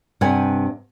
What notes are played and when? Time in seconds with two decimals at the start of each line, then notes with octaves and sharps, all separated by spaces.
0.21 G2 C3 B4 F#5 G#5